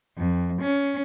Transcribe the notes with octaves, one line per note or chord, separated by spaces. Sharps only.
F2
C#4